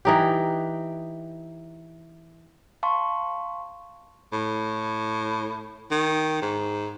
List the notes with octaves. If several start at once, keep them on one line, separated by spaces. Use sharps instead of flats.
E3 D#4 G4
F5 A5 C6 C#6
A2
D#3
G#2